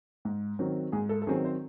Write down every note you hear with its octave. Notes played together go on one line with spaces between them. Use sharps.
G#2
D#3 F#3 C4
G#2 G#4
A4
A4
D#3 F#3 C4 G#4
C5